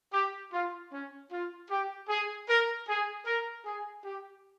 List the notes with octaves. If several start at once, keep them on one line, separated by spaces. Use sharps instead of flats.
G4
F4
C#4
F4
G4
G#4
A#4
G#4
A#4
G#4
G4